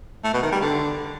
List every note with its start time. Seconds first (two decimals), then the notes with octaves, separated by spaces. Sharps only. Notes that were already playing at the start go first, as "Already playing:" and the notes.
0.24 A3
0.33 B2
0.43 D#3
0.52 G3
0.61 D3